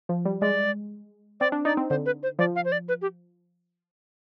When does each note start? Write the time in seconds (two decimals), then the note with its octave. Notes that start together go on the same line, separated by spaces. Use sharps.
0.09 F3
0.25 G3
0.41 G#3 D5
1.40 C4 D5
1.52 D4
1.65 D#4 D5
1.77 C4
1.90 D3 C5
2.06 B4
2.23 C5
2.39 F3 D5
2.56 F5
2.65 C5
2.72 D5
2.88 B4
3.02 G4